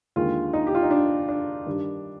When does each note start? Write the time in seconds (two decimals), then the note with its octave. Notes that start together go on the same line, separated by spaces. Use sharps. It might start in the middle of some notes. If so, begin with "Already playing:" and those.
0.16 D#2 D3 G#3 F4
0.53 D#4
0.67 G4
0.75 F4
0.83 D#4
0.91 D4
1.28 D4
1.66 G2 D#3 G3